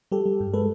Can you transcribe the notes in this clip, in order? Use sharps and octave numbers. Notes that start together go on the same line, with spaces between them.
G3 G4 A4
G3
G2
G#3 A4 B4